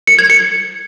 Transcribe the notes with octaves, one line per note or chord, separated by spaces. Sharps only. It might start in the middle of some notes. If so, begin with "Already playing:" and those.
C#7
G#6
C#7